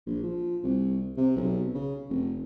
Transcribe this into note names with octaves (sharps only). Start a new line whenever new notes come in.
A#1
F3
C2
C3
B1
C#3
F1